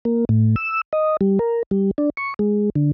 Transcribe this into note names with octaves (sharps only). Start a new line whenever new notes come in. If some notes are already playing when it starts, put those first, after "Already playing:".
A#3
A2
E6
D#5
G3
A#4
G3
D4
C#6
G#3
D3